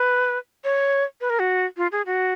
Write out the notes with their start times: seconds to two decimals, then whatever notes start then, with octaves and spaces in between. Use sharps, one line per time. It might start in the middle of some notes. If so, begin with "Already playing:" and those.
Already playing: B4
0.64 C#5
1.21 B4
1.30 A#4
1.39 F#4
1.77 F4
1.92 G#4
2.06 F#4